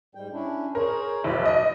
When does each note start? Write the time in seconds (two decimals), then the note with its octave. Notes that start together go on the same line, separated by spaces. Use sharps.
0.15 G#2 G3 G5
0.33 C#4 D4 E4
0.75 G#4 A#4 C5 C#5
1.24 F1 B1 B2 D5 E5
1.45 D#5